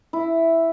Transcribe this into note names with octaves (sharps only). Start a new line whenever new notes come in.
E4